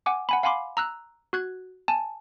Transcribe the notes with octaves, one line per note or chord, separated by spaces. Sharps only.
F#5 G#5 D6
F#5 G#5 B5
F5 F#5 G#5 B5 C6 D6
A#5 E6 F#6
F#4 F#6 G#6
G#5 A5